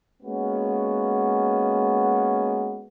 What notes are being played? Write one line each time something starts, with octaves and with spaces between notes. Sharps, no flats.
G#3 A#3 B3 C#4 F#4